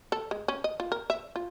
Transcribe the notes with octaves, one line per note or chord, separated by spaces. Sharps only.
A4
G#3
C#4
D#5
F4
A#4
E5
F4